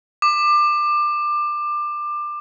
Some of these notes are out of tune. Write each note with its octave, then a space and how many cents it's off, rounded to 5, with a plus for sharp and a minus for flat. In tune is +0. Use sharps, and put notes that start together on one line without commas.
D6 +25